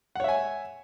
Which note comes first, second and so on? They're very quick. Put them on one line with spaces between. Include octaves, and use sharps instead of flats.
F#5 C#5 E5 G#5